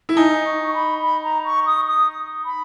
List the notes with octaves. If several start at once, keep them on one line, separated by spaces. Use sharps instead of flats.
E4
D#4 G#5
C#6
C#6
B5
B5
A#5
C#6
D#6
D#6
B5